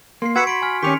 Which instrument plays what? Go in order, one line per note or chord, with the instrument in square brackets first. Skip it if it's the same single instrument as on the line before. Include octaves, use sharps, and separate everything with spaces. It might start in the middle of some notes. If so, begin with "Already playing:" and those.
[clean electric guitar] A#3 [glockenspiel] C6 C7
[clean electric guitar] F#4 [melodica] B4 F#5 E6 [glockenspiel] G#6 B6 C#7
[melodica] B5 [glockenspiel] C6 B6 D7
[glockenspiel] G#5 F6
[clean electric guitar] D#3 C#4 [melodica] G4 C#6 [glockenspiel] B6 F7